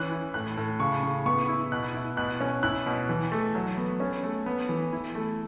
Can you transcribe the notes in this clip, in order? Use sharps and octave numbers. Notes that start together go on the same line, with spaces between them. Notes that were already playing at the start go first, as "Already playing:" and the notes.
Already playing: E3 C#4 F#6
E4
A2 F#6
A2
C#3 C#6
C#3
B3 C#6
E4
B2 F#6
E4
B2 F#6
C#4
E4 F#6
B2
E3
A3
F#3
B3
C#4
A3
B3
E3
E4
A3